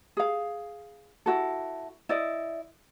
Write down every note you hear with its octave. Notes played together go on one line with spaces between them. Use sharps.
G#4 F5
E4 F#4 A4
E4 D5 D#5